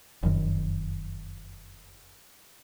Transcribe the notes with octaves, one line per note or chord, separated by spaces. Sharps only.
F1 F#2 D#3